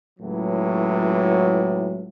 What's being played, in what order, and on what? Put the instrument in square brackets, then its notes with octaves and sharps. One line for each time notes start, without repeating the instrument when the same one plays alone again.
[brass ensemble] C#2 A2 E3 F#3